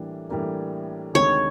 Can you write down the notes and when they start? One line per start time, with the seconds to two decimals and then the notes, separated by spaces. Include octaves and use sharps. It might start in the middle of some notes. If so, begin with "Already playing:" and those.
Already playing: A2 E3 G3 A#3 D4
0.29 A2 E3 G3 A#3 D4
1.14 D2 C3 D#3 G#3 C#5